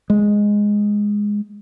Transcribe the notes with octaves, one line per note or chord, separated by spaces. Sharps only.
G#3